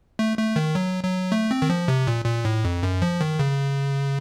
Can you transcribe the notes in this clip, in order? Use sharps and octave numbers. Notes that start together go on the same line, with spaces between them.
A3
A3
D#3
F#3
F#3
A3
C4
D#3
F3
C3
A#2
A#2
A2
F2
F#2
F3
D#3
C#3